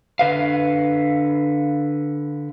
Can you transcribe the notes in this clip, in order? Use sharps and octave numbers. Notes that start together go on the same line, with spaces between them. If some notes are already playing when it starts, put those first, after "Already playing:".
D3 B4 F5